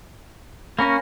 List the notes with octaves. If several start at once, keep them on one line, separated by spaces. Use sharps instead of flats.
A#3 C#4 B5 C#6 A#6